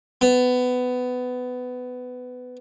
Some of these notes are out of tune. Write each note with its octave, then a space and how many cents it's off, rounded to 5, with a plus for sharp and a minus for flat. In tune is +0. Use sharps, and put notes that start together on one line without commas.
B3 +20